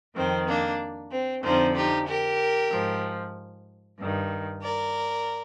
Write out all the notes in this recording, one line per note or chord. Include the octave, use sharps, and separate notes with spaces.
F2 D#3 C4
A#3 D4
C4
F2 D3 F3 C4 D#4
D#4 G4
G4 A#4
G#2 F3
G2 D#3
A#4 D5